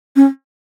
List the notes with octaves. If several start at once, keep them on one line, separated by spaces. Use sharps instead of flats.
C#4